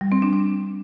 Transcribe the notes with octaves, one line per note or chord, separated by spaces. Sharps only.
G3
C4
D4
D4